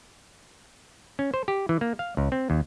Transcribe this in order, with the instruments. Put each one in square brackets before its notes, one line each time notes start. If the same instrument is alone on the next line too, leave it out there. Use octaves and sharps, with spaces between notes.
[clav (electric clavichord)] C#4
C5
G4
E3
A#3
F5
C#2
C4
D#2